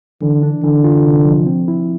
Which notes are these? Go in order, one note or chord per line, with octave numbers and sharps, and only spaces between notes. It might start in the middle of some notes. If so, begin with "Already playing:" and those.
D3 E3
D4
D3 E3
F4
C3
F3
C4
E4